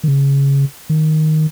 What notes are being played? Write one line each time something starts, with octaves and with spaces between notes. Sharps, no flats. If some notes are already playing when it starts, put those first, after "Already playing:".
D#3
C#3
D#3